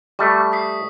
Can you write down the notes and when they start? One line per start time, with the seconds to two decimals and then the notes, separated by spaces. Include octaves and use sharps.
0.19 G3 A3 C#6
0.52 D#6 B6 C7